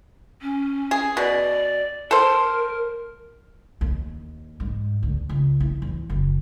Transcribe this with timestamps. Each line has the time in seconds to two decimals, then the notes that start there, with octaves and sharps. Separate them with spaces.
0.42 C#4
0.91 G#4
1.17 B2 D5
2.11 A4 A#4 C5
3.81 D#2
4.60 G#2
5.03 D2
5.29 C#2
5.60 E4
5.82 E2
6.10 F#1